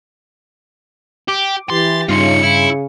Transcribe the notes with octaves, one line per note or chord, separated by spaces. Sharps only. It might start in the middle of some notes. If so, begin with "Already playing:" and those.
G4 D6
E3 G4 C6 A6
G2 C#3 D#4 F4 C6 C#7
E4